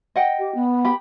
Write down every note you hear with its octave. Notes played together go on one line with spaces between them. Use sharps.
D#5 F#5 G5
G4
B3
G4 B5